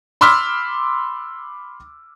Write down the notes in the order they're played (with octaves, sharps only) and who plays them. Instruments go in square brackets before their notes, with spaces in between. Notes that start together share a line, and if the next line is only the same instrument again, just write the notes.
[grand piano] B5 C6 D6 E6 F6 B6